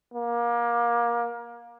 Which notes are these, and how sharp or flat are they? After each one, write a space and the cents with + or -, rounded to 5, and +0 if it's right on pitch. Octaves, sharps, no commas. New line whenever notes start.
A#3 +25